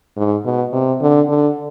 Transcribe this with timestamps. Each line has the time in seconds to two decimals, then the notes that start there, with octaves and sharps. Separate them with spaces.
0.17 G#2
0.45 B2
0.73 C3
1.01 D3
1.29 D3